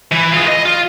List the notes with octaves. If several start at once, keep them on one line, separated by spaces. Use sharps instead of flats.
E3
F4 G#4
D#5
F4